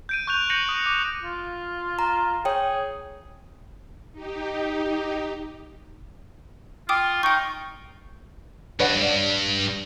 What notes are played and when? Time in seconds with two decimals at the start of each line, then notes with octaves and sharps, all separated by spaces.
0.09 G6 D7 D#7
0.27 C#6 F#6 G6 F7
0.50 G6 A#6 C#7 D#7 F#7
0.69 D#6
0.86 D6
1.23 F4
1.99 A#5
2.45 G#4 C#5 G5
4.13 D#4 G4
6.89 F4 G5 D6 D#6
7.23 D#4 G5 C#6
8.80 G2 B4 C#5 F#5
9.01 D5